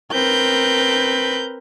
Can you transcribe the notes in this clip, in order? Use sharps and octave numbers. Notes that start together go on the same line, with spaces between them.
C4 A#4 B4 G6